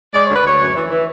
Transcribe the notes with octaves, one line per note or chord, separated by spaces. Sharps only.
G#3 D5
D2 C#5
B4
D2 C#5
F#2
E3
E3